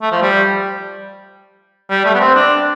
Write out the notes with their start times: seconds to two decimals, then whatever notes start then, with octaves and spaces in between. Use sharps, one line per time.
0.02 A3
0.12 F3
0.22 G3
1.90 G3
2.05 A3
2.14 B3
2.20 C4
2.35 D4